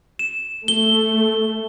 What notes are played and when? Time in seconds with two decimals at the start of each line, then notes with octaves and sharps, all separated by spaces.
0.19 E7
0.68 A3 G7